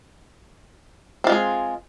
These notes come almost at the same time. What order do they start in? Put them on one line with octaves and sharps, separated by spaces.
C4 F4 G#3 G#4